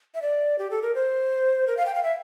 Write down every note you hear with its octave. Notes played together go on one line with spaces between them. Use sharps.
E5
D5
G4
A4
A#4
C5
A#4
F5
G5
F5
E5